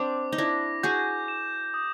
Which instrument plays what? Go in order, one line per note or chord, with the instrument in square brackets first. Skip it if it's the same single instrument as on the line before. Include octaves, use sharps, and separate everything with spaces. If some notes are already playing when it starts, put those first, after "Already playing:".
Already playing: [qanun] C4 D4 [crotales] D6
[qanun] D#4
[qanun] D4 E4 [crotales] A#6
[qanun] F#4 G#4 [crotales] G6
[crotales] E7
D#6